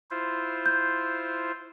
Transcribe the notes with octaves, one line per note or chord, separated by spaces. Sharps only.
E4 F4 C5
G6